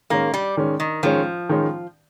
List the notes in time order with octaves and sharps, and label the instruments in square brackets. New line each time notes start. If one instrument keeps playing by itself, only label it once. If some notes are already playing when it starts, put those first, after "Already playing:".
[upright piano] D#3 G#3 C#4 [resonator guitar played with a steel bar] A#3
[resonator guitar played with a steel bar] G3
[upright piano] D#3 G#3 C#4
[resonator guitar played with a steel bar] D#3
[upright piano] D#3 G#3 C#4 [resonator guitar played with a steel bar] F3
[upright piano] D#3 G#3 C#4